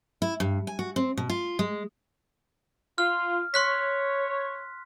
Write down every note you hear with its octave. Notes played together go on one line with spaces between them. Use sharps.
E4
G2
G#5
F#4
C4
B2
F4
G#3
F4 F6
C#5 C6 F#6 B6